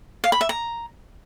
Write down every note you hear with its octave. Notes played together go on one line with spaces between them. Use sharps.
F5
B5
E5
A#5